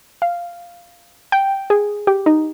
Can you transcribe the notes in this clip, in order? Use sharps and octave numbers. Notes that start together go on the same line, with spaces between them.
F5
G5
G#4
G4
D#4